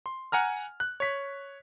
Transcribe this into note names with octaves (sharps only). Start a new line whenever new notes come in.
C6
F#5 G#5 A#5 F6
F#6
C#5 B6